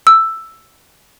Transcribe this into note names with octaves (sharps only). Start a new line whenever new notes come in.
E6